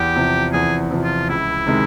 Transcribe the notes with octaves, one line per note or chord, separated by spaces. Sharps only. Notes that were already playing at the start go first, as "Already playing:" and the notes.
Already playing: E2 G4
C3 F3
E2 G#4
C3 F3
F4
C#2 E4
C3 D#3 G#3